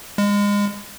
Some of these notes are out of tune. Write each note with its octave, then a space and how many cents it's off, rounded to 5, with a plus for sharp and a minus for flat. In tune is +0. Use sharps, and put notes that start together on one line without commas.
G#3 -30